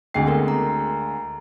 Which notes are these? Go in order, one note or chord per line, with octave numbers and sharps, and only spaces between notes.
D2 G#3 C4 G#4 G5 C7
B3 A4 A#4
A#5